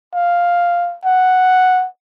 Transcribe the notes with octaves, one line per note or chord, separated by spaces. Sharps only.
F5
F#5